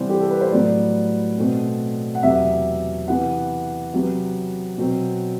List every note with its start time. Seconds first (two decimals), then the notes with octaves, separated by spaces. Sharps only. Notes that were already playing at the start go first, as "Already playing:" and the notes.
Already playing: C3 E3 G3 B3 C5
0.09 G4
0.21 A4
0.31 B4
0.41 C5
0.52 A2 F#3 B3 D5
1.37 B2 A3 C4
2.15 F#5
2.22 E2 C3 F#3 E5
3.07 C3 E3 B3 F#5
3.93 C3 F#3 B3
4.78 B2 F#3 C4